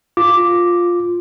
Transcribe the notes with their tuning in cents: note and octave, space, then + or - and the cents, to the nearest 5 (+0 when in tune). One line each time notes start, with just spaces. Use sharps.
F4 +5 D6 +0